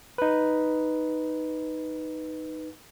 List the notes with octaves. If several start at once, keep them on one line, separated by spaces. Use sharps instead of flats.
D#4 B4